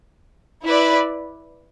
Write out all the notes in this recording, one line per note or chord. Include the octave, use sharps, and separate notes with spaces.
E4 B4 D5